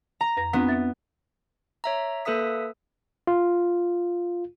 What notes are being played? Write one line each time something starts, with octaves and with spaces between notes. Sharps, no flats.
A#5
F2 B4 A#6
B3 C4 D4 F4
E5 A6
C#5 E5 A#5
A#3 A4 B4 E5 D#6 B6
F4